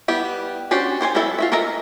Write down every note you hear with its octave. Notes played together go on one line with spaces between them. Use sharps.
G3 B3 E4 G4
C#4 D4 F#4 G4 C5
G4 C5 C#5 G#5
F#3 B3 E4 A4 E5
F4 F#4 E5
A4 A#4 D#5 E5 A#5